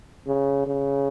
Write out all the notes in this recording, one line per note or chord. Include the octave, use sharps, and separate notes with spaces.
C#3
C#3